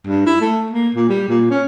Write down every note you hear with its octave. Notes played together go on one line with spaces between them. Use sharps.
G2
E4
A3
A#3
A#2
G3
A#2
C#4